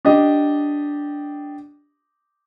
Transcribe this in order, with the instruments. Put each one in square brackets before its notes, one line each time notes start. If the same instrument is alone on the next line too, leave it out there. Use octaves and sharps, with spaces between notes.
[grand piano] D4 G4 D#5